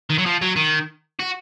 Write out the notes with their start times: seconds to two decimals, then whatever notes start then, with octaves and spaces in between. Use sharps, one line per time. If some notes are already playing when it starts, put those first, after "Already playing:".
0.10 D#3
0.18 F#3
0.26 F3
0.42 F#3
0.56 D#3
1.20 F#4